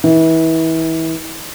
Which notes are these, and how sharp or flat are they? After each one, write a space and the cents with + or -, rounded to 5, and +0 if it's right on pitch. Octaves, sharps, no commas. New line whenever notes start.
E3 -30